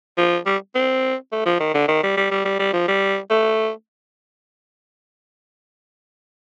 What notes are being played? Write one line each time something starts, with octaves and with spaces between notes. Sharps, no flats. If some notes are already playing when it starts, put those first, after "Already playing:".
F3
G3
C4
A3
F3
D#3
D3
D#3
G3
G3
G3
G3
G3
F3
G3
A3